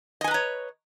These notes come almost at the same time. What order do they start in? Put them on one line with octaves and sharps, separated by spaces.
D#5 G#5 B4 A#5 C#5